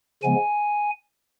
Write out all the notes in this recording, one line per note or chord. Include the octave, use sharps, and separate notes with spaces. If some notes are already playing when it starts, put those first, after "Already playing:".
C#3 F3 G#3 B3 G#5